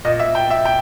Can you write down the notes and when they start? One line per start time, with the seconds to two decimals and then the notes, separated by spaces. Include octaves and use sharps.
0.05 A#2 D#5
0.19 E5
0.35 G5
0.50 E5
0.65 G5